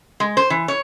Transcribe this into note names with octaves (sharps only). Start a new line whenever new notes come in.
G#3
C5
E3
C#5